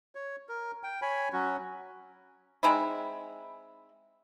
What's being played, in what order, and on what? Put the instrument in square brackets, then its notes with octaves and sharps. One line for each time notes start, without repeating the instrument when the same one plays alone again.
[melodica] C#5
A#4
G5
C#5 G#5 B5
F#3 C#4 F#4
[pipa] G#3 C4 D#4 E4